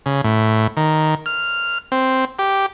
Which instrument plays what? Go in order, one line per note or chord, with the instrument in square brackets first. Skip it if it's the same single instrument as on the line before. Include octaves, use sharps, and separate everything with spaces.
[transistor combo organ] C#3
A2
D#3
F6
C4
G4